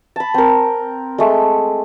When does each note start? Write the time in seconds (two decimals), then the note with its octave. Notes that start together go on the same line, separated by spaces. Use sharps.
0.16 A5 B5
0.34 C4 A#4
1.18 G#3 A3